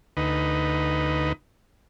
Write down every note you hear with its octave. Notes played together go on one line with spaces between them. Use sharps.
D2 D#4 B4